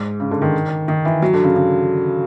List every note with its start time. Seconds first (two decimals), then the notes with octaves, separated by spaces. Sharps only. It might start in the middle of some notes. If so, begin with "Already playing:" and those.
Already playing: G#2
0.20 C#3
0.31 D3
0.42 D#3
0.88 D#3
1.05 E3
1.22 F#3
1.34 D3
1.44 C#3
1.55 C#3